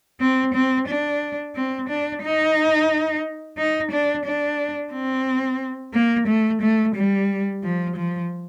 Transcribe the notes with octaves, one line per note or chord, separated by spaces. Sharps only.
C4
C4
D4
C4
D4
D#4
D#4
D4
D4
C4
A#3
A3
A3
G3
F3
F3